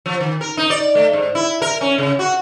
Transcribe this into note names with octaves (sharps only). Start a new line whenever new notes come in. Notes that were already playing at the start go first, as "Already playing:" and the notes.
F3
D#3
A#4
D#4
D5
A3
G#2
E4
A#4
C#4
C#3
F#4